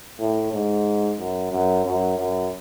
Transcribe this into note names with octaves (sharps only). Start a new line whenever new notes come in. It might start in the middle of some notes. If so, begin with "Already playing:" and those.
A2
G#2
F#2
F#2
F#2
F#2